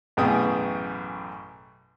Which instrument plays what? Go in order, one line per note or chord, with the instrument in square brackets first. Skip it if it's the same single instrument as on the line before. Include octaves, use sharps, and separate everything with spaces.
[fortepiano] A1 F#2 B2 G#4 G5 D#6